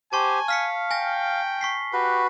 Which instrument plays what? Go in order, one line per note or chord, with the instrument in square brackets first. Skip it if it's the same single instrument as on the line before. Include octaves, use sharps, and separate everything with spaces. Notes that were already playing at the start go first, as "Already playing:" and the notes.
[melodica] G4 C5 [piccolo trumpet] G#5 [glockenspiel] A5 C#6
[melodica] F5 [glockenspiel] F6 B6 C#7
[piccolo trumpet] G5 [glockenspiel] G#5 A#6
[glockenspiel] C#6 B6 C7
[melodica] F#4 B4 [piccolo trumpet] G4